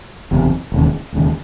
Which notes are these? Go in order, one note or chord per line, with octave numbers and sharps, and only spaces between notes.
F#1 E2 C3
E1 D#2 C#3
E1 D#2 C#3